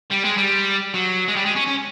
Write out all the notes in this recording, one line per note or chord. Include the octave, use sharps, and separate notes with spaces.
G3
G#3
G3
F#3
G#3
G3
G#3
C#4
C#4